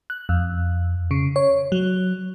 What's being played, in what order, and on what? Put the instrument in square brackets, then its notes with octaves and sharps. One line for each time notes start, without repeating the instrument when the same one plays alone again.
[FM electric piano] F#6
F2
C#3
C#5
F#3